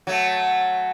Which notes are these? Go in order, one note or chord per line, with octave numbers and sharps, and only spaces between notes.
F#3 A3